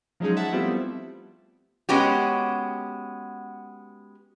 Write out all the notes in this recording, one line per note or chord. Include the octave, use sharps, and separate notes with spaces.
F3 F#3 G#3 C#4 D#4 G#4
E5 F#5 A5
F3 G3 A3 B3 C4 E4
G#3 B3 C#4 F#4 G4